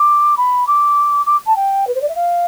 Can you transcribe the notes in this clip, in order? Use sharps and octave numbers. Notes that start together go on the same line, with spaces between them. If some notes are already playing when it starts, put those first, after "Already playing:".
Already playing: D6
B5
D6
D6
A5
G5
B4
C5
D5
E5
F5